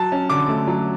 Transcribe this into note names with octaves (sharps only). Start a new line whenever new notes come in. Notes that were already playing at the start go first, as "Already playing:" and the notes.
Already playing: F#3 A5
C#4
D3 D6
A3
F#3